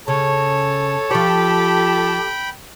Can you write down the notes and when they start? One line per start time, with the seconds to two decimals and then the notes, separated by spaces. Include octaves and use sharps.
0.08 C#3 A4 C#5 A5
1.11 F3 G4 C#5 G5 B5